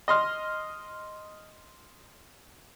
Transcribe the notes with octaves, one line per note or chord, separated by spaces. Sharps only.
D#5 C6 F6